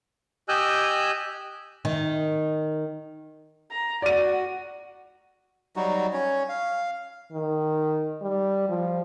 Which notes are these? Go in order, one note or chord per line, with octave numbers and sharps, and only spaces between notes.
G4 D#5 G#5 E6 F#6 G6
D#3
A#5
F#4 D5 F#5 D#7
F#3 G3 D#4 F#4
C#4 C#5
F5
D#3
G3
F3